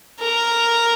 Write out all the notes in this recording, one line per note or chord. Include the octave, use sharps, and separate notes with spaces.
A#4